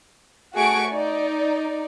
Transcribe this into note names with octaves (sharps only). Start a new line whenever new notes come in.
A3 F#4 G#4 G#5 C#6 D7
D#4 D5